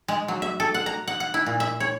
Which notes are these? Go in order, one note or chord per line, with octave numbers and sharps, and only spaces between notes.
G#3
F#3
E5
A4
F#5
A#5
F#5
F#5
E4
A#2
E5
C#5